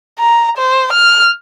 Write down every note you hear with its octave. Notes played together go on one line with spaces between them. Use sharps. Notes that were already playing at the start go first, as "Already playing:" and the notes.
A#5
C5
F6